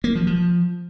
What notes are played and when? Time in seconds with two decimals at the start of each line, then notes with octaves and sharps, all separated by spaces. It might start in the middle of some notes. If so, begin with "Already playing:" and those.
0.04 A#3
0.15 F3
0.27 F3